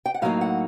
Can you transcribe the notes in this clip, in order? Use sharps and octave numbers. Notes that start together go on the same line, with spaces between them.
G5
F#5
A2 F#3 A#3 D#4 F5
F#5